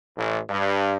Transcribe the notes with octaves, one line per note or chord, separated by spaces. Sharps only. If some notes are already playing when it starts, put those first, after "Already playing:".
A1
G2